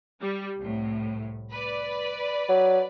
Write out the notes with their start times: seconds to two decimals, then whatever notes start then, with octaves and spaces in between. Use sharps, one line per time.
0.21 G3
0.58 C2 A2
1.51 B4 D5
2.49 F#3